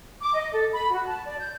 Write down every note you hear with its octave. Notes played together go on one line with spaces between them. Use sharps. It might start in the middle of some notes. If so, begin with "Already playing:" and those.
D6
D#5
A4
B5
F#4
A5
D5
G6